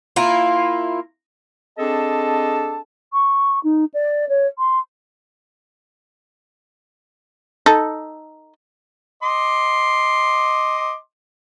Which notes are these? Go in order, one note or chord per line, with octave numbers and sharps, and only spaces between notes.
A#3 E4 F4
C4 D4 G#4 A4 D#5 A5
C#6
D#4
D5
C#5
C6
D#4 A4
D#5 C6 D6